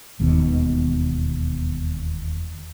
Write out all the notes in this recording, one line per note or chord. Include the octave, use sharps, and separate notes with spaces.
E1 D#2 B2